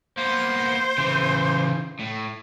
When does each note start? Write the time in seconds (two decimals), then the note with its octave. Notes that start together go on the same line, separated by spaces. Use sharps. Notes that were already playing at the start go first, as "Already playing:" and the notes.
0.17 A#3 B3 C5
0.98 C#3 E3
1.99 A2